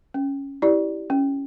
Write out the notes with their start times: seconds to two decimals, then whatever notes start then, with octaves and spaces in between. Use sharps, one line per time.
0.14 C#4
0.62 E4 G4 D5
1.10 C#4